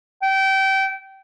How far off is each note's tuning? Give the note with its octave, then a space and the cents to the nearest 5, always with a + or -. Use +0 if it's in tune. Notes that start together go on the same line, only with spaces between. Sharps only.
G5 -25